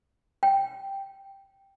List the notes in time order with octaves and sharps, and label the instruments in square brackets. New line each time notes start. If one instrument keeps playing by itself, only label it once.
[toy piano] G5